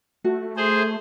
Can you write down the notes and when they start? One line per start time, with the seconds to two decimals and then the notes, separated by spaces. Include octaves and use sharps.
0.24 A3 F#4
0.57 G#4 C5